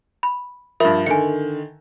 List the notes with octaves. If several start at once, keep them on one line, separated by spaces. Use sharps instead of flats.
B5
G2 F3 A#4 E5 B5
D3 D#3 G#5 C#7